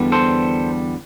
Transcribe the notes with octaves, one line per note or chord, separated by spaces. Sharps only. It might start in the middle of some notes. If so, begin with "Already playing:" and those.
Already playing: E2 D3 G3 B3
A4 C5